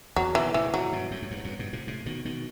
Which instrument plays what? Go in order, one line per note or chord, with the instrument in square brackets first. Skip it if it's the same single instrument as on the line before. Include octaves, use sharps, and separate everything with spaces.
[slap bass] E2 [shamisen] F#3
[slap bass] B2 D#3 [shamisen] E3
[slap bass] A2 C3 [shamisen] E3
[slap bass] A2 C3 [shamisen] F#3
[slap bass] G2 B2
F#2 A2
F#2
E2 G2
F#2
E2 G2
G2 B2
A2 C3
A2 C3
B2 D#3
B2 D#3